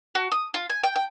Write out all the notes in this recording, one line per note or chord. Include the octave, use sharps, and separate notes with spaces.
F#4
D#6
F4
G#5
G5
G5